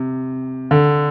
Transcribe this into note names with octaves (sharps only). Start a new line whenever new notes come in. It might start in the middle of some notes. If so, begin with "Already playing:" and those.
Already playing: C3
D3